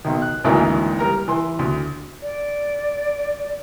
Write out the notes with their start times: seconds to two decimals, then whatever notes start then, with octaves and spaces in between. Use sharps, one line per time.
0.05 B1 D#3
0.22 F#6
0.44 G#1 D2 G#2 E3 A#3
0.99 G3 A#4 A#5
1.28 E3 C6
1.59 D2
2.22 D5